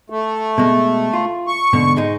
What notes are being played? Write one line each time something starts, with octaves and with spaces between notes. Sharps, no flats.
A3
B2 G#3
F4
C#6
G#2 B2 D3
G#2 G#3 D#4